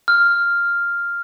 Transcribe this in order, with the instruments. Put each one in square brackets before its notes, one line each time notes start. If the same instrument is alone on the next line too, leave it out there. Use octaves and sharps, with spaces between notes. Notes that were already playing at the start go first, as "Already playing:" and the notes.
[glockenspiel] F6